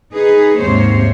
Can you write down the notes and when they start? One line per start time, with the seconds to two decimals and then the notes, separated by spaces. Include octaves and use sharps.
0.13 D#4 G#4 B4
0.59 D#2 G#2 C3 A#3 C5 C#5